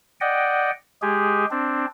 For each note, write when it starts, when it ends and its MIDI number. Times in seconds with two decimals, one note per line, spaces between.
0.21 0.71 74
0.21 0.71 75
0.21 0.71 78
0.21 0.71 79
1.02 1.45 56
1.02 1.45 67
1.02 1.45 68
1.51 1.86 60
1.51 1.86 62